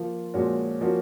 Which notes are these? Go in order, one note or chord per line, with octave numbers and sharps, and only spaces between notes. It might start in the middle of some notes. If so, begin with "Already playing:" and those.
Already playing: F3 A#3 F4
A#2 F3 G#3 C#4 F#4
F3 A#3 C#4 F#4